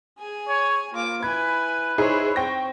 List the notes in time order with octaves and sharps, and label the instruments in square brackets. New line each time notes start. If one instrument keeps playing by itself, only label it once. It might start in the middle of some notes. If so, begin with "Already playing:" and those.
[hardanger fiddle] G#4 G#5
[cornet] C#5
[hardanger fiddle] A#3 D6 [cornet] F4
[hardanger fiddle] E4 G#5 [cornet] B4 [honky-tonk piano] G#6
[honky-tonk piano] D#4 E4 G#4 [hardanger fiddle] C5 C#5
[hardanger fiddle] C4 [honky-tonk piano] G5 C#6 A#6